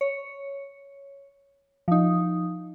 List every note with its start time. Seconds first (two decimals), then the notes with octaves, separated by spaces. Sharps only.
0.01 C#5
1.88 F3 D#4